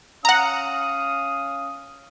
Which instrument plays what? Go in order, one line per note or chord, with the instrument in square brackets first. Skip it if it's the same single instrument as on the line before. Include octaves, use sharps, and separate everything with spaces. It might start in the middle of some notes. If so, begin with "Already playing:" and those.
[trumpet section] C#4 F5 D#6 [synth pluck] F#5 A#5